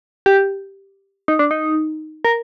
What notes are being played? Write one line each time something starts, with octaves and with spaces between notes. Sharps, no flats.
G4
D#4
D4
D#4
A#4